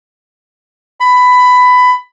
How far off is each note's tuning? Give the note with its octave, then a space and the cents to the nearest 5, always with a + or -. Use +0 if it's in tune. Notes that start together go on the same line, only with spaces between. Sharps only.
B5 +15